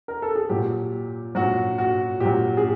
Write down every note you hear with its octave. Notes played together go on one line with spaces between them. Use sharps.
A#4
A4
G#4
A#2 F#3 G4
A#2 F#3 F#4
F#4
A#2 F#3 G4
G#4